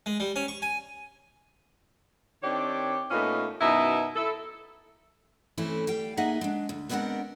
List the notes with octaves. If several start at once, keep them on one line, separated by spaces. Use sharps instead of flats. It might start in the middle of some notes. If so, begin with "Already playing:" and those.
G#3
G3
C#4
C#6
G#5
D#3 C4 D4 G4 C#5 D5
A#2 A3 B3 C#4 D#4 F4
F#2 B2 D#4 E4 E5
E4 A4
E3 A3 C4 C#4 E4
G3 F5 G5
A#3 D#4 G#4 D#5 E5 F#5
G#3 D4
D2
G#3 B3 C4 D4 A#4 F#5